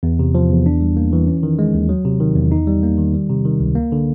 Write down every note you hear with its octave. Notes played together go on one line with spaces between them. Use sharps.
E2
C3
F3
E2
D4
G3
A#3
E3
C#4
D#3
G#3
D#2
F#3
C3
D#3
E2
D#4
G3
A#3
D#3
G3
C3
D#3
C#2
A#3
D3